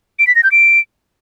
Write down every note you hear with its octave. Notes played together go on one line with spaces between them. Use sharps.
D7
B6
A#6
G6
D7